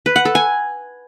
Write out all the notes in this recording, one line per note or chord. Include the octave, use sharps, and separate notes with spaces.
B4
F#5
A4
G#5